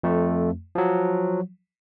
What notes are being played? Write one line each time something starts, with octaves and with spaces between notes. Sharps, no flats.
F2 A3
F3 F#3